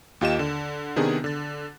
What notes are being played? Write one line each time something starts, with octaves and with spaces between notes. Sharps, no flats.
D#2 F4 G4 D#5 E7
D3
C3 D#3 B3 D4 G#4
D3 A6